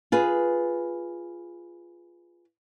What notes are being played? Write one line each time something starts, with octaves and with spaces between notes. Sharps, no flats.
F4 G#4 B4